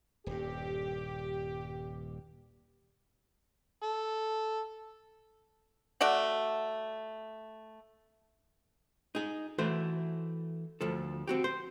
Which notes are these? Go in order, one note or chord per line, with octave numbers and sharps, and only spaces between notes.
D#1 G2 G4
A4
A3 F#4 D5 F#5
D#4 G#4
E3 A3 F#4 C5
D2 F3 A4
C4 F#4 G4
C5